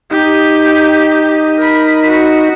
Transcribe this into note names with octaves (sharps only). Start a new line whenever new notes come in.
D#4 G4
A#4 B5
F#4